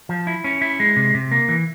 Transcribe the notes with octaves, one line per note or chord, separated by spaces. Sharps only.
F3
E4
C#4
E4
G#3
C3
C3
A#3
E3